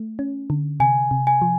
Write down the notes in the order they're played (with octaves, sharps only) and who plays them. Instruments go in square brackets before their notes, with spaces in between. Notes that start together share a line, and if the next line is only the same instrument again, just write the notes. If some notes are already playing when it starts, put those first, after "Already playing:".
Already playing: [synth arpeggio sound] A3
C#4
D3
[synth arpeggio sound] C3 [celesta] G#5
[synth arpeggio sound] C3
[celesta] G#5
[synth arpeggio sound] F3